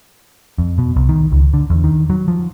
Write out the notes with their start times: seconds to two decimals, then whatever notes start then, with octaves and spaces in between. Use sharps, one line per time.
0.58 F2
0.78 B2
0.96 C2
1.09 D#3
1.32 C#2
1.54 D3
1.70 E2
1.84 D#3
2.10 F#3
2.28 F3